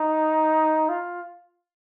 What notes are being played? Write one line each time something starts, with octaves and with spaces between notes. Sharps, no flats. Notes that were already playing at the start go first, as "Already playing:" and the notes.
Already playing: D#4
F4